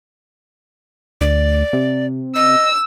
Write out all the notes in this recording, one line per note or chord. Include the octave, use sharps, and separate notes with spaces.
D2 D5
C3
D#5 E6